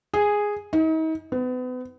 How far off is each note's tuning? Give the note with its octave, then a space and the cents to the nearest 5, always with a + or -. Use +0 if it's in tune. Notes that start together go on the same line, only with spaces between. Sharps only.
G#4 -5
D#4 +40
B3 +35